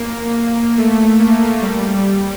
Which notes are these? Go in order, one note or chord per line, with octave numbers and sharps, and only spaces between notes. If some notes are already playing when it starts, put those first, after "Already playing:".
Already playing: A#3
A3
A#3
G3